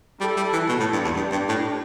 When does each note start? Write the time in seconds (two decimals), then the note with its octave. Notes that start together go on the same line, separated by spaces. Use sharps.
0.20 G3 E4 A4
0.37 G3
0.53 E3
0.69 B2
0.80 A2
0.93 G2
1.04 E2
1.16 G2 D4 G4
1.32 G2
1.49 A2